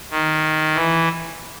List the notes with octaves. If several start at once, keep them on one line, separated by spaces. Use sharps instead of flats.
D#3
E3